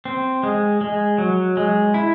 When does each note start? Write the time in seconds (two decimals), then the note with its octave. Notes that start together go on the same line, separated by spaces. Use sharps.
0.05 C4
0.43 G#3
0.81 G#3
1.18 F#3
1.57 G#3
1.94 E4